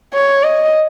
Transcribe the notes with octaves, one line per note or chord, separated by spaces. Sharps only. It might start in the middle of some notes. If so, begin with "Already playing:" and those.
C#5
D#5